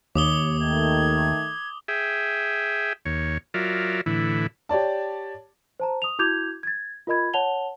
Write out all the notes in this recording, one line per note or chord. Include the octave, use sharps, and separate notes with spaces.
D#2 C#5 D6 D#6 G7
D#3 A3 G#6
G#4 E5 G5
D#2 C#5
F#3 F4 A#4 D5 E5
A2 D3 E3 E4
G4 C#5 D5 A5
C5 A5 A#5
D#6 F7
E4 F#4 D6 G6 G#6 F7
G#6 A6
F4 A#4 D#5 B5 G#6
C#5 F#5 A5 F7 G7